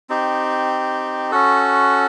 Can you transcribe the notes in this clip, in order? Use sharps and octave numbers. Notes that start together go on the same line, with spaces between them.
C4 D#4 G4
C#4 F#4 A4